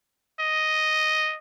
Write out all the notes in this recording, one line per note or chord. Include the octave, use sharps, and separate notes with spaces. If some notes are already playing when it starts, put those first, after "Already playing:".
D#5